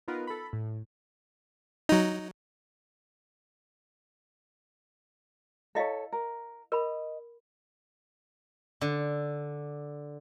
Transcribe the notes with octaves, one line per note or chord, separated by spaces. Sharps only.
B3 D#4 F4 A#4 B4
A4 B5
A2
F#3 D#4
E4 A4 C#5 D#5 F5
A#4
A#4 D#5 B5
D3